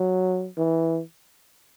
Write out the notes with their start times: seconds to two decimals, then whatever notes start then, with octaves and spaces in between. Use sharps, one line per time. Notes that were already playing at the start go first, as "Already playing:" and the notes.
Already playing: F#3
0.57 E3